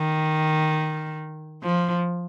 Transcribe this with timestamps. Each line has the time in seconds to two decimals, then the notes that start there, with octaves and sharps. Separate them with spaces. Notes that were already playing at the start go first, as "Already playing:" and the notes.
Already playing: D#3
1.63 F3